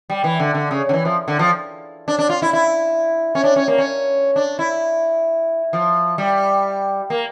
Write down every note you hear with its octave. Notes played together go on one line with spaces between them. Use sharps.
G3
E3
D3
D3
C#3
D3
E3
F3
D3
F3
D4
D4
F4
E4
E4
C#4
D4
C#4
A#3
C#4
D4
E4
F3
G3
A#3